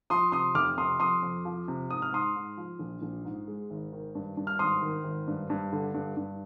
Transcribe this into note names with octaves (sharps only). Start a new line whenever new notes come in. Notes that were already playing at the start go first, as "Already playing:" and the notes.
F3 C6 D#6
C3 C6 D#6
F1 D6 F6
C3 C6 D#6
F2 C6 D#6
F2
F3
C3
G#2 D#6
F6
G#2 C6 D#6
G#2
F3
A#1
A#1
G#2
G#3
G#1
D#3
G2
G2
F6
G#1 C6 D#6
D#3
G#1
G2
G2
D3
G2
G2